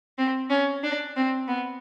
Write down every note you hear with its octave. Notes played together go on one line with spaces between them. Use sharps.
C4
C#4
D4
C4
B3